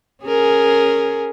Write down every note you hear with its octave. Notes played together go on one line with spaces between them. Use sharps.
C#4 G#4 A#4